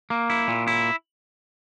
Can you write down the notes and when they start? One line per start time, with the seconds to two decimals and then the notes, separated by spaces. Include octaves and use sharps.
0.10 A#3
0.30 E4
0.48 A#2
0.67 E4